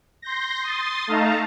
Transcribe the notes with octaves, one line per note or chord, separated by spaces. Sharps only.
C6 G6 A#6
C6 D#6 A6
A3 D#4 F5 A5 A#5